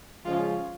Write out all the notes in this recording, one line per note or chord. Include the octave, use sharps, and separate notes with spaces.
C#3 F3 G#3 C#4 F4